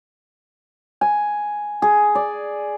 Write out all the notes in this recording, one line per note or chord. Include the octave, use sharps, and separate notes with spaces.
G#5
G#4
D5